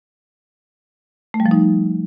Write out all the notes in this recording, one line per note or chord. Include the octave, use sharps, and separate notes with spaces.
A3
G3
F3
D#4